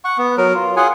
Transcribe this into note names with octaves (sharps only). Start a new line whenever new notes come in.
F#5 C#6
B3
F#3 A#4
F4
F4 G#4 F#5 G#5